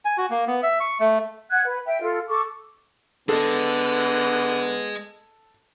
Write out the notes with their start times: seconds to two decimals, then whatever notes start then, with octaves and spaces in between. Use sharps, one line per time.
0.05 G#5
0.18 F#4
0.30 A#3
0.47 B3
0.63 E5
0.80 C#6
1.00 A3
1.50 F#5 F#6 G#6
1.65 B4
1.86 E5 G5
2.01 F4 A4
2.29 A4 C#6 D6
3.29 D3 B3 G#4 A4 D#5